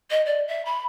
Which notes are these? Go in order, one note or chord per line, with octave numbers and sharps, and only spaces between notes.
D#5
D5
E5
B5